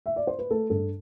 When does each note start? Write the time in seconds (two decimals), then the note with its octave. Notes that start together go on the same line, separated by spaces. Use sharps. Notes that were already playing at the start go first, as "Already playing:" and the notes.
0.06 E5
0.16 D5
0.27 C5
0.39 B4
0.50 A3 A4
0.70 G2 A4